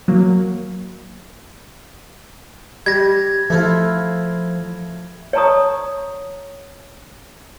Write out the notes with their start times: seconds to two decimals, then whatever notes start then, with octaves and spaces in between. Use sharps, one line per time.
0.08 F#3 A#3
2.86 G3 G#6 A#6
3.50 F3 A3 E4 F4
5.33 C#5 D5 A5 A#5 C#6 D#6